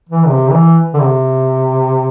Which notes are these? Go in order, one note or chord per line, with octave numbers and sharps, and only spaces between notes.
E3
C3
E3
D3
C3